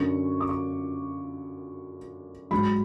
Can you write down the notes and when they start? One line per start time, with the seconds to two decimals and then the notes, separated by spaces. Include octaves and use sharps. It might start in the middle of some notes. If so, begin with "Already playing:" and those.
Already playing: F#2 D3 F#3 C#6
0.41 D6
0.49 C#6
2.51 G#2 F#3 B5